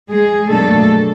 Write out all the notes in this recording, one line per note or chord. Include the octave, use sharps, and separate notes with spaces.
G#3 G#4
B2 F#3 A3 A#3 D4 A4